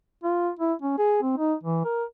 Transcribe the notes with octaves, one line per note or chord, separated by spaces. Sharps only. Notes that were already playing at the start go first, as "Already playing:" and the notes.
F4
E4
C#4
G#4
C4
D#4
E3
A#4